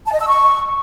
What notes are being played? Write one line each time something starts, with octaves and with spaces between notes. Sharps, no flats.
A5
D#5
E6
C#6